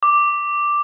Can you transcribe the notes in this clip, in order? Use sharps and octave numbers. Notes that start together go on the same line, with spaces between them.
D6